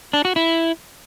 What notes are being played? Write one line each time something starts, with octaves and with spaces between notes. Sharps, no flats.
D4
F#4
E4